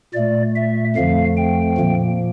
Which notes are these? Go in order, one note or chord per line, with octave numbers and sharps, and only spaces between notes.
A#2 A3 D5
E5
F2 D3 F3 A3 F5
G5
A#2 F3 A#3